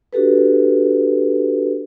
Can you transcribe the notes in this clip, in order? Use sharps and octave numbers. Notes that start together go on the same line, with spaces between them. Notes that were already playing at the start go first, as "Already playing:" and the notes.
D4 F#4 G4 A4 B4